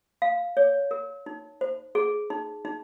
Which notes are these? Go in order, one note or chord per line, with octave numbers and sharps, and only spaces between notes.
F5
C#5
A#4
D#4
C5
G#4
D#4
D#4